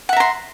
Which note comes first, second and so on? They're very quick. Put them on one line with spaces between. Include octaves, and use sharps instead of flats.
F#5 E5 A#5 C6